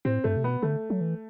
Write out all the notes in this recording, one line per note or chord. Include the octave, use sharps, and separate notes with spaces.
A2 C4
G2 A3
C3
B2 B3
D3 A3
F#3
E3